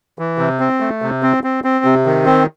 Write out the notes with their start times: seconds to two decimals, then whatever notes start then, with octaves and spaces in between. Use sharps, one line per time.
0.19 E3
0.38 C3
0.60 C4
0.80 A3
1.02 C3
1.23 C4
1.44 C4
1.64 C4
1.85 C3
2.06 D#3
2.26 C4